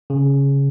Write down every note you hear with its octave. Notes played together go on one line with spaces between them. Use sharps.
C#3